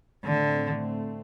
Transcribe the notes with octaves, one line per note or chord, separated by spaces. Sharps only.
A2 D3 A3 C4